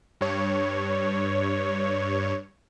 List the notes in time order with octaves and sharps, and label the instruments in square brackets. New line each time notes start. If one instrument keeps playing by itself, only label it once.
[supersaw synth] G2 C#5